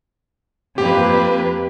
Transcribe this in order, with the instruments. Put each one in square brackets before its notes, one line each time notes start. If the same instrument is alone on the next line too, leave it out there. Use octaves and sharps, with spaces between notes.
[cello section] F2 A#3 B4 [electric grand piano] G4